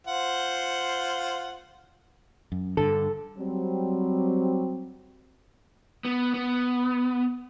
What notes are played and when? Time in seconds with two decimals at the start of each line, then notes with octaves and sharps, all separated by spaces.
0.07 F4 C5 F#5
2.52 F#2
2.77 G2 D3 A4
3.38 F#3 G3 C4
6.05 B3
6.34 B3